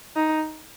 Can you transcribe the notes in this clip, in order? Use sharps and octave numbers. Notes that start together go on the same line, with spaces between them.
D#4